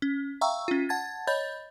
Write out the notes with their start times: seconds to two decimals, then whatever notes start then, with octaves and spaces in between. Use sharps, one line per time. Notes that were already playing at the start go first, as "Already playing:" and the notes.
0.02 C#4
0.41 E5 F5 G5 A#5 C#6 E6
0.68 C#4 F4
0.89 F#5 A5 G#6 A6
1.27 C#5 D#5 B5 G6 A6